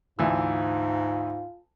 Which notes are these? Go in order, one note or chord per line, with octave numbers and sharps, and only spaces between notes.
D2 G#2 E3 F4 E6